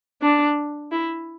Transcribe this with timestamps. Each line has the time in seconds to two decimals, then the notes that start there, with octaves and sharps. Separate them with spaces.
0.22 D4
0.92 E4